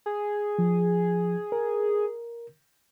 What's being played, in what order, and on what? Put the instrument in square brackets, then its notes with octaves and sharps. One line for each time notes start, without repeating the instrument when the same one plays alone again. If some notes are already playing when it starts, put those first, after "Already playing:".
[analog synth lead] G#4
[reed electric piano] F3
A#4